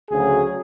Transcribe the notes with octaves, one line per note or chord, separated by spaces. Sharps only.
D2 C#3 F#3 G#4